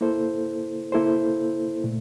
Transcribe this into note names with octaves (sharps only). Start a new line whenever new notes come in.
A#3 E4 A4 C5
A#3 E4 A4 C5
A#2 A3